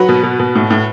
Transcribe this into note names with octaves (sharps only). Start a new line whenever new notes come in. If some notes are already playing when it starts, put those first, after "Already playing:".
Already playing: F#3 F#4 B4
B2
B2
B2
A2
A2